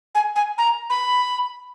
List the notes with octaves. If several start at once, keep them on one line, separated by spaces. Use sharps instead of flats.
G#5
G#5
A#5
B5